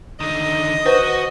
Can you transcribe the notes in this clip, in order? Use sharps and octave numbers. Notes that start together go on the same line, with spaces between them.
D3 D#3 D#5
F#4 B4 C5